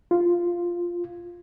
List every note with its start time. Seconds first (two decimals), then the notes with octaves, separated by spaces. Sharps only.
0.11 F4